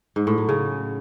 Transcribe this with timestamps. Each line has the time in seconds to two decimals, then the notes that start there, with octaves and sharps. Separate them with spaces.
0.16 G#2
0.27 A2
0.38 F#3
0.49 C#3